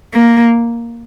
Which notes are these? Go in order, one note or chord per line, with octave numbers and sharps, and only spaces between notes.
A#3